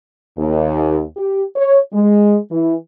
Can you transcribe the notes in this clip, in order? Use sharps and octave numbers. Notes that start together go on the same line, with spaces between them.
D#2
G4
C#5
G#3
E3